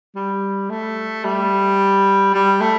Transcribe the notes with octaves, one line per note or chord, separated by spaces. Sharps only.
G3
A3
G3
G3
A3